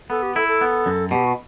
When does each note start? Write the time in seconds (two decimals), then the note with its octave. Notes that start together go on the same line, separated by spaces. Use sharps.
0.10 B3 A4
0.22 G4
0.36 E4 A4
0.48 A4
0.61 B3
0.86 F#2
1.11 B2 G4
1.24 F#4